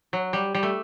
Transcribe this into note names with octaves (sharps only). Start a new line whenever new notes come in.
F#3
G3
G3
A3